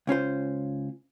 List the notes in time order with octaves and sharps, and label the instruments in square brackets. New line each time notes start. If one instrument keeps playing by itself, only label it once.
[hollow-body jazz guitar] C#2 C#4 F4 C5